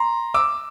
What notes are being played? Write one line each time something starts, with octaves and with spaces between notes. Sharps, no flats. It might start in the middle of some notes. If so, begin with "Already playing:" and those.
Already playing: A#5 C6
D6 E6